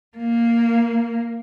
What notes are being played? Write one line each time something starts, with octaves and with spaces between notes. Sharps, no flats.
A#3